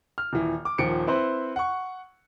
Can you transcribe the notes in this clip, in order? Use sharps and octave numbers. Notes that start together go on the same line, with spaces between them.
F6
D#1 E3
D6
D#1 D#3 F3 C#7 D7
C4 E4 B4 C5
F#5 C#6